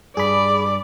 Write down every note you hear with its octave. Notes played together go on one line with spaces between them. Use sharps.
G2 G#4 D5 B5